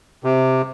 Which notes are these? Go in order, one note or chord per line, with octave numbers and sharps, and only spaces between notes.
C3